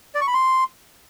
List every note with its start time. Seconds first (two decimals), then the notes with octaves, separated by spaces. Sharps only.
0.15 D5
0.21 C#6
0.28 B5
0.34 C6